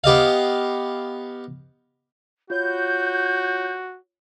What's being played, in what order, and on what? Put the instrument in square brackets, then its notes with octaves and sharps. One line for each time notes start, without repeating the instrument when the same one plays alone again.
[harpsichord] B3 G4 D#5 F5
[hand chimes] F4 C#5 [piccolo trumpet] F#4 [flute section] G6